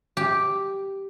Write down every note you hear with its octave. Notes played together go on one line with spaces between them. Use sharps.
G4